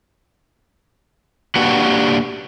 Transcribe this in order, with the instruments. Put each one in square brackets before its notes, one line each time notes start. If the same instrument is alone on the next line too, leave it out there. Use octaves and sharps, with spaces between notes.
[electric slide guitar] A#3 D4 F#4 G4 B4 F#5